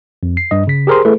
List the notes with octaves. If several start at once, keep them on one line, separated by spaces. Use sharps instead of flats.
F2
C7
G2 D#5
C#3 B6
G4 G#4 A#4 C5 C6
A3 E4 G#4 A4 B4